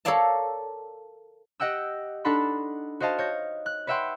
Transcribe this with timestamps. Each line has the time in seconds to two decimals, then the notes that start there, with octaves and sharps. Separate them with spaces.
0.05 A4 A#4 C#5 D5 F5 A5
1.60 G4 D#5 F#5 G5 E6
2.24 D4 D#4 A4 F#5 B5 C6
3.00 F#4 C5 D#5 F5 A5
3.18 C#5 G6 A#6
3.66 F#6
3.87 B4 C#5 E5 F#5 G5 C6